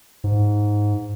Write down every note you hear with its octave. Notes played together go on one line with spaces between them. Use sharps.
G#2